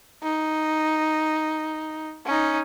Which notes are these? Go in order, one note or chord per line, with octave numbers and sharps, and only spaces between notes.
D#4
C#4 D#4